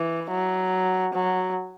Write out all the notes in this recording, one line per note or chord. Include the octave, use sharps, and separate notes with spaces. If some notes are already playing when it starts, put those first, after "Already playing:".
Already playing: E3
F#3
F#3